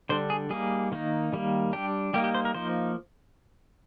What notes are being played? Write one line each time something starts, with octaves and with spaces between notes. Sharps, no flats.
D3 G3 D4 C5
G#4
G3 A#3 D#4 G#4
D#3 A#3 D#4
D#3 G3 A#3
G3 D4 G4
G3 A#3 D#4 G4
G4
C5
A#4
F3 A#3 D#4 C5